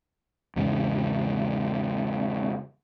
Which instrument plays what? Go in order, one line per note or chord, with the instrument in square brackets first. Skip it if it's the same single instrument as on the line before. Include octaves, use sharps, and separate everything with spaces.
[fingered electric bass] E2 G#2 C#3